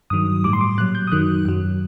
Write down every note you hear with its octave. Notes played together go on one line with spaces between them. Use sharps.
G2 D#3 F#3 D#6
A2 G3 D6
C6
D6
A#2 F#3 F#6
G6
D#6
F#2 D#3 F#3 F#6
F#2 F#3